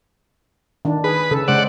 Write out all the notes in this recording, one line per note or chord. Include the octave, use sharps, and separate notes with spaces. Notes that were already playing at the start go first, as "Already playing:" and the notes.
D#3 D4
G#4 B4
C#3 A4
C#3 G#3 C5 D5 F#5